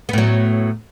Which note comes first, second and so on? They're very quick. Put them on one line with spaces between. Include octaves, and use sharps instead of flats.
B3 A2 F#3